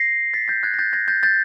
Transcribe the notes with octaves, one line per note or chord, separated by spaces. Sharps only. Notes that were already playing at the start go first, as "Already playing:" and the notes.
Already playing: A#6 C7
A6 B6
G6 A6
F#6 G#6
A#6
G6 A6
G#6 A#6
G6 A6
G6 A6